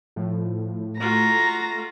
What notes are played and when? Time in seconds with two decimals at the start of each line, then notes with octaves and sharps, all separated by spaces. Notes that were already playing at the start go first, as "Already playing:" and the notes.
0.16 A2 F3
1.00 A3 F4 F#4 A#5